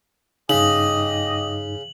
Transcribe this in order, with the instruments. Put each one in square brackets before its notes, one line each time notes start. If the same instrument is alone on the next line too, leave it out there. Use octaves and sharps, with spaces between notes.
[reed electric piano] G2 D#4 [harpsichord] C#3 [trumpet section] G4 D#5 [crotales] F#7